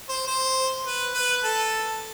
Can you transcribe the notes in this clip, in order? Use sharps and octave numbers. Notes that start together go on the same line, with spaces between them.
C5
C5
B4
B4
A4